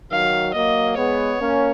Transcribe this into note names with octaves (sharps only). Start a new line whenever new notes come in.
D#3 F#3 F5
F#3 A#3 D#5
G#3 B3 C#5
A#3 C#4